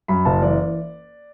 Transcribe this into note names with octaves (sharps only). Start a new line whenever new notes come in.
F#2 B5
F#1 A5
E3 D5